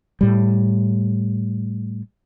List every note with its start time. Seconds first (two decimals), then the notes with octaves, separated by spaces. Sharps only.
0.21 A2 G3